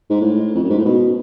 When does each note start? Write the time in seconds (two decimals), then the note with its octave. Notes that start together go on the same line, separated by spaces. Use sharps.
0.10 G#2
0.21 A2
0.55 F2
0.63 F#2
0.70 G#2
0.78 A2
0.85 B2